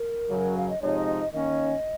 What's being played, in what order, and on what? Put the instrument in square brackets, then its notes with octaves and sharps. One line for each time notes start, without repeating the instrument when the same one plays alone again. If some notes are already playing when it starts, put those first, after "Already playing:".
Already playing: [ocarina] A#4
[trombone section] F#2 C#3 F#3
[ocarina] F5
D#5
[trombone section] C3 F3 G#3 D#4 [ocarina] C#5
[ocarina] D#5
D#5
[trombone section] D#3 A#3 C#4 [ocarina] D#5